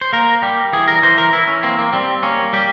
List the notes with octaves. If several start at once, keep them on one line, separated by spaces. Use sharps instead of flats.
C5
A#3 A#4
G3 G4
E3 G#4
A#4
E3 C5
A#4
E3 E4
C#4
A#3 C4
A#3
G3 C4
A#3 C#4
G3 G4